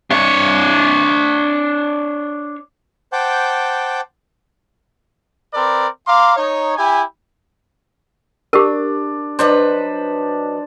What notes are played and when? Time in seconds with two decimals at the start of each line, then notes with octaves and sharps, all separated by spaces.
0.11 D4 C#5
3.12 C5 F#5 G5 A5 D6 G6
5.54 C4 A#4 B4 D5
6.07 F5 A#5 C6 D6
6.36 D#4 C#5
6.77 E4 G4 G#5
8.53 D4 G4 A#4
9.39 F#3 D4 D#4 B4 C5